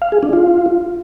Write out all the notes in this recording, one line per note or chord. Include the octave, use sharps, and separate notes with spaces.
F5
G#4
D4
F4